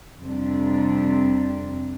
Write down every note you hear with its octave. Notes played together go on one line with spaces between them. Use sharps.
F2 C3 G3 D4